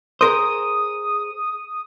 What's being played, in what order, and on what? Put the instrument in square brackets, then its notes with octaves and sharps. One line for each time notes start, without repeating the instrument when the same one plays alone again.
[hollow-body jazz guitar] G#4 A#4 C5 [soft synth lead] D#6